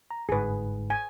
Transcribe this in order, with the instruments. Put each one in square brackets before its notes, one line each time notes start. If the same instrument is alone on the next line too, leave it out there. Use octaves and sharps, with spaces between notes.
[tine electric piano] A#5
[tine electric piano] G1 G#2 [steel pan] G#4 B4
[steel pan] G#5